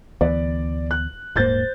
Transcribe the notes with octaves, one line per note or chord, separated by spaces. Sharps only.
D2 E3 B3 D5
F#6
D#1 G#2 A#3 C5 G6 A6